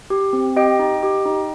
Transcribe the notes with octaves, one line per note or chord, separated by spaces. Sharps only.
G4
C4
G4 D#5 G5
D#4
G4
D#4